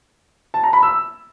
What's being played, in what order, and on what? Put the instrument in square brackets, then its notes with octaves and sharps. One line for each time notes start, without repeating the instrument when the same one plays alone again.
[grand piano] A5
A#5
B5
E6